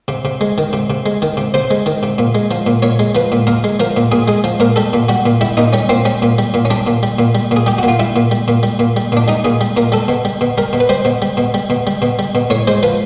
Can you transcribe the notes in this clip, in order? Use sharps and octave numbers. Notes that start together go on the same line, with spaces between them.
C3
C3
G#3
D#3
C3
C3
G#3
D#3
C3
C3 C5
G#3
D#3
C3
A#2
G#3
F3
A#2
A#2 C#5
G#3
F3 B4
A#2
A#2 A#4
G#3
F3 A#4
A#2
A#2 G#4
G#3 G#4
F3
A#2 A#4
G3 A4
A#2
G3 F#4
A#2
G3 E4
A#2 D#4
G3 C#4
A#2 C4
G3 C#4
A#2
G3
A#2
C#4
G3 D4
A#2
G3
A#2
G3
A#2
G#4
G3 G4
A#2 F#4
F4
G3 E4
A#2
G3
A#2
G3
A#2
G3
A#2 D4
G3 D#4
A#2 G#4
G3
A#2 A#4
G3 A4
B2
G3
B2
G3 A#4
B2
B4
G3 C5
B2
G3
B2
G3
B2
G3
B2
G3
B2
A2 C#5
G#3 C5
F3 B4